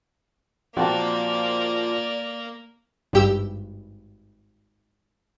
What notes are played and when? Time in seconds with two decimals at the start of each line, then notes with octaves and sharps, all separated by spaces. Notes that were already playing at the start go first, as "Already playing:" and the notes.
0.77 A#2 F3 A#3 C4 F#4 D5 G5 A5
3.13 G#1 G2 G4 G5 E6